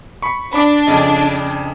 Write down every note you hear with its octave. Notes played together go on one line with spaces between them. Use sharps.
B5 C#6
D4 B5 D6
F2 C#3 D#5